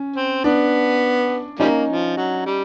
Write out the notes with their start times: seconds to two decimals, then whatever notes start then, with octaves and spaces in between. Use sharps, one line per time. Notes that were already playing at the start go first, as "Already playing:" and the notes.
Already playing: C#4
0.16 C4
0.44 B3 D4
1.59 F3 G3 A#3 C#4 D#4
1.88 F3
2.17 F#3
2.46 G3